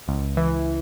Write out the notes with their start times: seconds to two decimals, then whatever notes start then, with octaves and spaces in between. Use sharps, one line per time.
0.08 C#2
0.37 E3